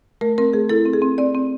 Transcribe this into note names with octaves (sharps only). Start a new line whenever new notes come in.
A3 A#4
C4 A#4
A3 G#4
E4 A4
C4
G#4
C4
C4 D5
C4